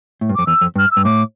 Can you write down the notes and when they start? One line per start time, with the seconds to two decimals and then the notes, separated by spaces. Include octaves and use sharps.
0.21 A2
0.30 G2
0.35 F2 D6
0.47 E2 E6
0.61 F2
0.76 G2 F6
0.91 E6
0.97 G2
1.05 A2 D6